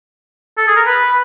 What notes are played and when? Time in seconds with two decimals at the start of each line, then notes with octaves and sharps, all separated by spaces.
0.57 A4
0.68 G#4
0.76 A#4
0.86 B4